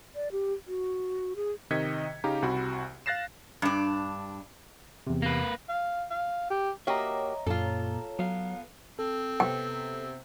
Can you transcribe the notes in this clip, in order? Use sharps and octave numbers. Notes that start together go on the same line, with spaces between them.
D5
G4
F#4
G#4
C3 D#3 D#5 G#6 B6 C#7
C#3 D#4 G4 F5 A#5
C2 C3 F#4 B5
F5 F#6 A6 A#6 C7 E7
G2 D4
E2 C3
A#3 B4
F5
F5
G4
A#3 F#4 G4 C#5 D#5 E5 A#5
F#2 A#2 F4 A4
F#3 B3 F5
C4 A4
C3 B3 G5